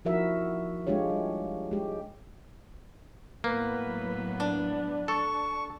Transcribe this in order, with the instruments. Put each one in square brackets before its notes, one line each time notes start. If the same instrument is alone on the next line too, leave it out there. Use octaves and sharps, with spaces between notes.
[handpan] F3 D#4 E4 F#4 A#4 E5
G#3 D4 F4 G4 C#5
G3
G#3 G4
[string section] A2 F#3 B3 [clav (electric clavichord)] A#3 [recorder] B4
[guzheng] D4
[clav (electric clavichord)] A4 [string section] A5 [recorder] C#6